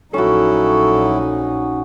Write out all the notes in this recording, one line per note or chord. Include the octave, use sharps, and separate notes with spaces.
A#1 F#3 C#4 D#4 E4 F#4 A4